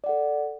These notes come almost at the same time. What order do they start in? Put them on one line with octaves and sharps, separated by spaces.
D5 F#5 A4